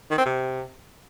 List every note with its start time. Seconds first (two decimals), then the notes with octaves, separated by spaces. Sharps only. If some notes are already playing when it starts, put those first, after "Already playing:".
0.10 D#3
0.18 C4
0.26 C3